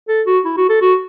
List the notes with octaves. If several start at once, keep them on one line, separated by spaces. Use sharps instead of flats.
A4
F#4
E4
F#4
A4
F#4